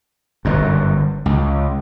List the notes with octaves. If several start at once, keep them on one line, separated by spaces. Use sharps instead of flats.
G1 F#2
C#2